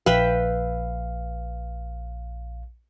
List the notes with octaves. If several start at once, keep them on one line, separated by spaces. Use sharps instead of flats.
A#1 B4 E5 F5 G5